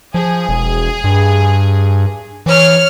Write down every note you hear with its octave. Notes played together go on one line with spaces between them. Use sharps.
F3 G#4
E1
G2
E3 C#5 F6